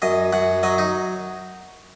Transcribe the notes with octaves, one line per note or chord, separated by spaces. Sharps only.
F#2 D#5
F#2 F#5
F#3 D#5
D#4